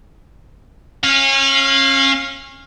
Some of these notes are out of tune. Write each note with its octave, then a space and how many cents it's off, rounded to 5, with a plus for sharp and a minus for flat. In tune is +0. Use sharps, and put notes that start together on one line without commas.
C#4 -30 F5 +0